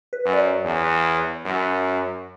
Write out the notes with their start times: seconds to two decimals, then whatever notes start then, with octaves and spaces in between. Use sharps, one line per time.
0.13 B4
0.25 F#2
0.33 D5
0.39 C#5
0.65 E2
1.45 F#2